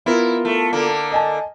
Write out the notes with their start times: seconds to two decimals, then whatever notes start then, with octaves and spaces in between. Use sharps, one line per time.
0.06 B3 E4 F4 A#4
0.45 A3
0.73 D3 A#3
1.12 D#5 G#5 A5